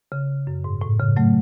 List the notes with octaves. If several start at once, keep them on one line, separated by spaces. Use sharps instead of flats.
C#3
F#2
G#2
A2
C#3
F#3 A3